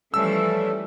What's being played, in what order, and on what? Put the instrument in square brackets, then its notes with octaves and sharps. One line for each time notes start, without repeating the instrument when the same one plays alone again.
[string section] E3 F3 G3 [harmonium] A3 C#4 A4 [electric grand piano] E6